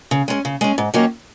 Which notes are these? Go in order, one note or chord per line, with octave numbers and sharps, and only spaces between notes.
C#3
G#3 C#4
C#3
G#3 C#4
G#2
D#3 F#3 A#3 C#4